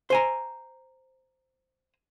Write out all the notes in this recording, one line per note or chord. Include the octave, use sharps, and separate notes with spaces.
C5 G#5 A#5